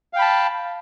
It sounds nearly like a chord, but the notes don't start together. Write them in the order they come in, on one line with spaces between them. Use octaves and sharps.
F5 G5 B5 A5